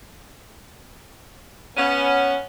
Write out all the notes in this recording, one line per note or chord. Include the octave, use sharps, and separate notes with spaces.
B3 C#4